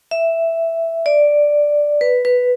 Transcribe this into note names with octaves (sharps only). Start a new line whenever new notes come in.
E5
D5
B4
B4